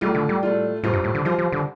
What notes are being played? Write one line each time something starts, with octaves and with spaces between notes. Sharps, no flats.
A2 G3 A3 F4
D3
G3
A2 A3 F4
A2 G3 F4 C5
G2
A2
D3
F3 G3 F4 C5
F3
D3